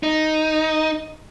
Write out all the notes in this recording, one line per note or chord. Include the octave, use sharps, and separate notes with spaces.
D#4